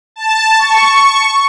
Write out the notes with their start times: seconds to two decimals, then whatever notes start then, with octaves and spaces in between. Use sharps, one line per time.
0.16 A5
0.59 C#6